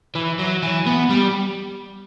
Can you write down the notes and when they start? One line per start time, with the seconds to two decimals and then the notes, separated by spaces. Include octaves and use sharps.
0.15 E3
0.39 F#3
0.63 E3
0.87 B3
1.10 G3